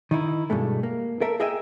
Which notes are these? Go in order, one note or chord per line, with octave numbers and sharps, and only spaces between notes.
D#3 D#4 E4
G2 B2 G#3 A3
A#3
A4 A#4 E5
G#4 D#5 E5 G5 G#5